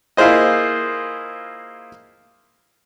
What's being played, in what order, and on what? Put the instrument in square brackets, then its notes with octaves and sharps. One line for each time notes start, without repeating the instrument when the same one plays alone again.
[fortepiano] A#3 E4 F4 G#4 C5 D#5